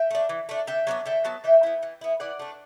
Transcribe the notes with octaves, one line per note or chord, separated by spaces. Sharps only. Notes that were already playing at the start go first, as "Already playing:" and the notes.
Already playing: E5 G5
A3 D4
E3
A3 D4
D3 E5 G5
F#3 B3 D4
D3 E5 G5
F#3 B3 A5
E3 E5 G5
B3 E4
E3
B3 E4
E3 D5 F#5
A3 D4